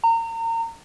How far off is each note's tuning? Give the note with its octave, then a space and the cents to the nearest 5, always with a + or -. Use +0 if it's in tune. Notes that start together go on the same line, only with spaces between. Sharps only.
A#5 -30